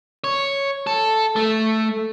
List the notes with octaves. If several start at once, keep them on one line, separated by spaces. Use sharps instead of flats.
C#5
A4
A3